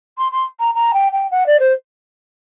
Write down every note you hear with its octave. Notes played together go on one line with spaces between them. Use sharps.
C6
C6
A#5
A#5
G5
G5
F#5
D5
C5